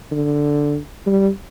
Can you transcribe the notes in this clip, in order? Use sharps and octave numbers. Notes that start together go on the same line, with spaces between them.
D3
G3